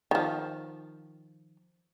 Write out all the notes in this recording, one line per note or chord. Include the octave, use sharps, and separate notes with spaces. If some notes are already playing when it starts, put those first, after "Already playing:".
D#3 F3